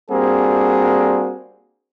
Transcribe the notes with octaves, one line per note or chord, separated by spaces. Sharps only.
G3 A#3 C4 D4 F#4 G#4